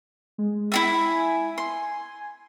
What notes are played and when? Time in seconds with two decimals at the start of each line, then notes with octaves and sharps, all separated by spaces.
0.38 G#3
0.72 E4 F#4 E5
1.02 G#5
1.58 C6